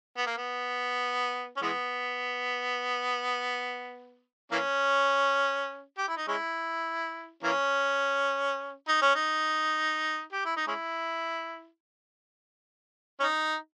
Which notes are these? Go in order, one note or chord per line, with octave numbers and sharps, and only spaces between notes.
B3
A#3
B3
C#4
E3 G#3 B3
E3 A#3 C#4
G4
E4
D#4
G#3 C#4 E4
E3 A#3 C#4
D#4
C#4
D#4
G4
E4
D#4
G#3 C#4 E4
C#4
D#4